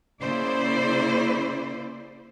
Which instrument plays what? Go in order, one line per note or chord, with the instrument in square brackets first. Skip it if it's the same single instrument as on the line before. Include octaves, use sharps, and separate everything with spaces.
[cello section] C#3 A#3 E4 C5 D5